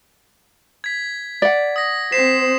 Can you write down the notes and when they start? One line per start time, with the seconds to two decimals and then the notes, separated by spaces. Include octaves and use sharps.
0.84 G#6 B6
1.42 D5 F#5
1.76 D#6 A#6
2.12 C4 C5 B6 C7 E7